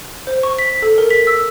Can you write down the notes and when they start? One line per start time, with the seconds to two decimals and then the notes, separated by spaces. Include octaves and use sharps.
0.27 C5
0.43 C#6
0.59 B6
0.82 A4
0.98 A#4
1.10 B6
1.27 E6